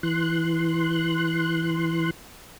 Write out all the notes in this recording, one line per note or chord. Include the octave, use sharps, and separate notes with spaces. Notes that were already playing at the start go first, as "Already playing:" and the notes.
E3 C6 F#6